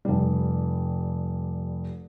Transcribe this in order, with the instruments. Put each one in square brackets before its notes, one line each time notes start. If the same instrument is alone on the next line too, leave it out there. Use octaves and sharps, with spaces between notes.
[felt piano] F1 G3